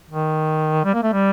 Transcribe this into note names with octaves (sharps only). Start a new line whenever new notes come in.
D#3
G3
A#3
A3
G3